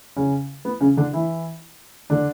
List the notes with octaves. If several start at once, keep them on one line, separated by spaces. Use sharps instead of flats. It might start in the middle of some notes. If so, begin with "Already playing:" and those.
C#3 C#4
B3
C#3 C#4
D3 D4
E3 E4
D3 D4